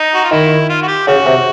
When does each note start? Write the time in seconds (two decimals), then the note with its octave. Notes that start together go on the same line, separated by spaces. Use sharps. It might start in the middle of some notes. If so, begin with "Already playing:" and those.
Already playing: D#4
0.14 F#4
0.24 F4
0.31 D#3 E4
0.69 F4
0.82 F#4
0.88 G4
1.07 C#3 F#4
1.26 C3